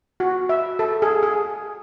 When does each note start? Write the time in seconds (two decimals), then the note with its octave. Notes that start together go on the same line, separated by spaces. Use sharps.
0.20 F#4
0.49 E5
0.79 A4
1.02 G#4
1.23 G#4